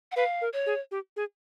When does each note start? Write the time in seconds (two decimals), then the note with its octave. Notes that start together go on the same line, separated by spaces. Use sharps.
0.12 F#5
0.16 B4 F5
0.41 A#4
0.53 C#5
0.66 G#4
0.91 G4
1.16 G#4